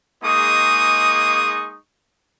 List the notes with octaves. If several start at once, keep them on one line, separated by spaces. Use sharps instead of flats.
G#3 A#3 D#4 G#4 C#6 D#6